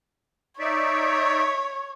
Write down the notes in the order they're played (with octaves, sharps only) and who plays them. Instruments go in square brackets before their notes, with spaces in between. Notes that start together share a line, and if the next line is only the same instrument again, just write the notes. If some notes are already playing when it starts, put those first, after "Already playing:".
[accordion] D#4 D5 E5 [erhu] C#5